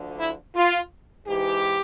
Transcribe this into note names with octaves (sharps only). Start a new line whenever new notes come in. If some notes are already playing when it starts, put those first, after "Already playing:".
Already playing: D2 D3 F3
E4
F4
G#2 E3 G4